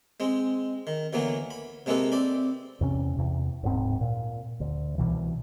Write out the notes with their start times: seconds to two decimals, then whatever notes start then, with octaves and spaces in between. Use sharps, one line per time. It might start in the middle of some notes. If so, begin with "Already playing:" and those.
0.20 G#3 C4
0.87 D#3
1.13 D2 E3 F#3 A#3 B3
1.51 B5
1.86 C3 G#3 A#3 A4 B4
2.12 C4 D5 B5
2.81 E2 C3 C#4
3.16 E2 C3
3.63 D1 G#2 C4
4.01 A#2
4.60 D2
4.98 C2 B2 E3